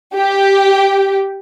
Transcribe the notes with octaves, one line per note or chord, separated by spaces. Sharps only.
G4